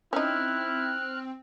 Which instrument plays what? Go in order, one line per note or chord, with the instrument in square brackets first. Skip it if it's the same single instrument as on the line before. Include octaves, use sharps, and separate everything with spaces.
[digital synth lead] C4 [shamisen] C#4 D#4 [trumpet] E4 [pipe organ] F6 F#6